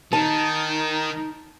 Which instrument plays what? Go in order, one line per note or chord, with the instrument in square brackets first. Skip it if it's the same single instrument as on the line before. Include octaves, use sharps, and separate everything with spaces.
[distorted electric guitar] D#3 [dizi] D#4 [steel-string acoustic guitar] A5